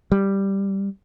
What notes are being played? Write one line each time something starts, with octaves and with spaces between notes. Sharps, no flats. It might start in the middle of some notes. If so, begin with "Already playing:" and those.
G3